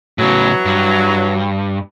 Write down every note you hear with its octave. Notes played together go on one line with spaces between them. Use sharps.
A2 C#3 E3 F#3
G2